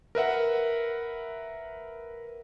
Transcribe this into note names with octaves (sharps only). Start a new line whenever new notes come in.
A#4 B4 E5 F#5